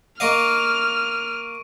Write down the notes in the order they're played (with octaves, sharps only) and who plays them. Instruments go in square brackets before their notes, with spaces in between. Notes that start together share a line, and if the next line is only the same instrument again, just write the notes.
[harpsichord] A#3 D#5 F5 [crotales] C#6 D7 D#7 [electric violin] F6